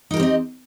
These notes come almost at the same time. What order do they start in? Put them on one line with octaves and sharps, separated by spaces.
D#4 A#4 G4 C4 D#5